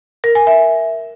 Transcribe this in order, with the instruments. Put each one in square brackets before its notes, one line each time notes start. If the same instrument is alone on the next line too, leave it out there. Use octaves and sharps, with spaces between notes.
[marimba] A#4
G#5
E5